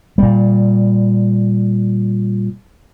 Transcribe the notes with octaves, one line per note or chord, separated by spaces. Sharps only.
A#2 G3